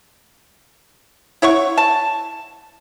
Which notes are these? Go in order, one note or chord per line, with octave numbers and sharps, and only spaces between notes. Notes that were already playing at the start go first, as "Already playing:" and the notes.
E4 C#5 F#5 C#6
A5